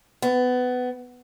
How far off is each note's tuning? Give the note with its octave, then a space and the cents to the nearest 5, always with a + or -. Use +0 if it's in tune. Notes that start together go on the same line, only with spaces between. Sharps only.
B3 +20